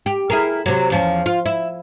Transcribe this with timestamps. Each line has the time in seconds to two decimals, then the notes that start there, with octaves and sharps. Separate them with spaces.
0.06 G4
0.30 E4 G#4 A#4
0.66 C3 F#3
0.90 E2 F3 C#4
1.26 F4
1.46 E4